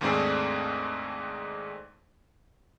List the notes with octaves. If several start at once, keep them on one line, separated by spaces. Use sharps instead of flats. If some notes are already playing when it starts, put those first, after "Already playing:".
D#2 G#2 A3 C4 D4 G#4